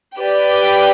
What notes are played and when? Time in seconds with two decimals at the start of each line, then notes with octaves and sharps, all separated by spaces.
0.18 G4 B4 D5 G5